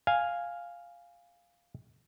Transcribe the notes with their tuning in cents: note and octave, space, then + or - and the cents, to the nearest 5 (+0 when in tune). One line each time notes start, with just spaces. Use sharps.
F5 +0 G#5 -5